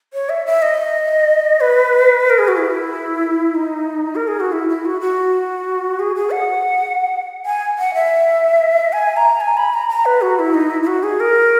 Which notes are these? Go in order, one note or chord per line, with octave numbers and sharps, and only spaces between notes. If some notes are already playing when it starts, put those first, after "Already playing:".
C#5
E5
E5
D#5
B4
A#4
G#4
F#4
E4
D#4
A#4
G#4
F#4
E4
E4
F#4
F#4
G#4
G#4
F#5
G#5
F#5
E5
G#5
A#5
G#5
B5
A#5
A#5
B4
F#4
E4
D#4
E4
E4
F#4
G#4
A#4